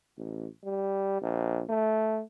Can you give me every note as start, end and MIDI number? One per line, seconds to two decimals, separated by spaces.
0.18 0.47 33
0.64 1.19 55
1.22 1.62 34
1.69 2.21 57